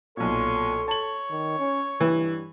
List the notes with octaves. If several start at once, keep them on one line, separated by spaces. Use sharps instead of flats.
B1 A#2 A4 C#5 C6
C#5 A5 F#7
D#3
C#4
G2 E3